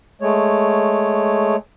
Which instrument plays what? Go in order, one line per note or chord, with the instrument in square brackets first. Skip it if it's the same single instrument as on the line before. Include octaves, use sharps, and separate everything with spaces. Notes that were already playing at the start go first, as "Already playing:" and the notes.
[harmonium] G#3 A3 C#5